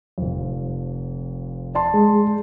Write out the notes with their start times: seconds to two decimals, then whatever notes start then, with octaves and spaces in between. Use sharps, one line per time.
0.18 F1 F2
1.75 D5 A5 C6
1.94 G#3 G#4